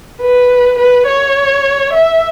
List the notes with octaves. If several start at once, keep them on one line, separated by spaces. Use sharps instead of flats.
B4
B4
C#5
E5